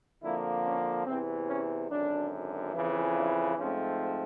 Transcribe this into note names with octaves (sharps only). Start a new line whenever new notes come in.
F2 D3 F3 A#3 E4
C#4
E2 C3 E3 C4
C#4
G#1 F#2 D3 D4
F2 C#3 E3
D4
G#2 F3 A3 C4 C#4